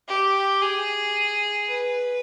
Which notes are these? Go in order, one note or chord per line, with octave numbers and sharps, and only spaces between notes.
G4
G#4
B4